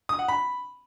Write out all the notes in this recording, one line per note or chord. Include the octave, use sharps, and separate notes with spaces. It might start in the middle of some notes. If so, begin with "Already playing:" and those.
D#6
F#5
B5